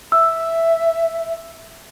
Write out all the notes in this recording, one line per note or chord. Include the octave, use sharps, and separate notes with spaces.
E5 E6